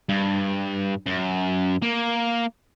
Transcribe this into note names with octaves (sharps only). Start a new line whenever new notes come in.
G2
F#2
A#3